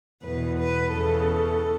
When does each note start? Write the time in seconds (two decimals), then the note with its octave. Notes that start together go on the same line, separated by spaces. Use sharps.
0.23 E2 B2 B4
0.57 B4
0.91 E2 C#3 E3 A4